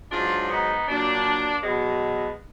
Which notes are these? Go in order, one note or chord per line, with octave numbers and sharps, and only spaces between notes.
G#2 F#3 D4 F4
B3 D#4
A#2 F#3 A#3 D4
B2 F#3 G#3 B3